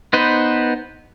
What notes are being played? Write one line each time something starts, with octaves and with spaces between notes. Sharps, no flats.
B3 D#4 B4 C5